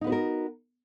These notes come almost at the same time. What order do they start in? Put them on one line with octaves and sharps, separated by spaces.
D#4 B3 B4 F#4 A#4